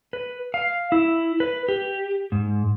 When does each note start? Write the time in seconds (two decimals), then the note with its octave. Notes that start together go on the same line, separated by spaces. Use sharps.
0.13 B4
0.54 F5
0.92 E4
1.40 B4
1.68 G4
2.32 G#2